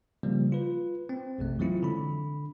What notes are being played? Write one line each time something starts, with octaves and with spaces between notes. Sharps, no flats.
C#3 F3 G3 A#3
F4 B4
C4
A#1 F2 C3 A3
E3 F#3 G#3 C4 E4 F4
D3 B5